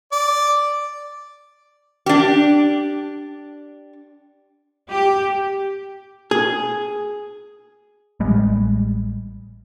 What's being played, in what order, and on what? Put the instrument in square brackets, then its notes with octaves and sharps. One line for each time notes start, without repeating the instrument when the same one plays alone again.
[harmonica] D5
[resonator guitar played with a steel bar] D4 G4
[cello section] G4
[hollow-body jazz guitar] G#4
[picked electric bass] A1 G3 G#3